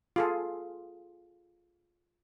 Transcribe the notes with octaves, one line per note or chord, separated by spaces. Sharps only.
F4 G#4 A4